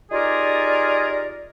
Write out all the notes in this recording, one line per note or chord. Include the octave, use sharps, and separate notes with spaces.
D#4 F4 G4 G#4 A#4 D5